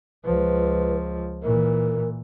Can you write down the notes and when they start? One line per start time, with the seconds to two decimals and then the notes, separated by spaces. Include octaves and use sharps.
0.25 C#2 F3 B4
1.43 A#2 E3 A#4